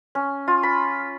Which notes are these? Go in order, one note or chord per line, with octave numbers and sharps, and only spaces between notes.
C#4
F4
B5